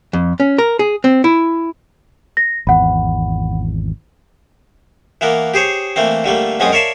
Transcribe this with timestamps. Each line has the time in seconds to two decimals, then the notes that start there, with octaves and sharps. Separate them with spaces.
0.13 F2
0.40 C#4
0.58 A#4
0.79 G#4
1.04 C4
1.24 E4
2.37 A#6
2.67 G#1 E2 F#5 B5
5.21 E3 A#3 B3 A#4
5.54 G4 G#4 C5 C#5
5.96 E3 A3 A#3 C4
6.24 D3 G3 A3 A#3
6.60 F#2 B2 G#3 C4 C#4 D#6
6.72 A#4 C#5 D5 E5 F5 A5